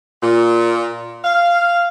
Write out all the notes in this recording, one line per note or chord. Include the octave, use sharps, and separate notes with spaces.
A#2
F5